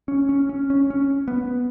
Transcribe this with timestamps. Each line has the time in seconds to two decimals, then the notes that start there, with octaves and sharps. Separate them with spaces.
0.08 C#4
0.29 C#4
0.49 C#4
0.70 C#4
0.90 C#4
1.28 B3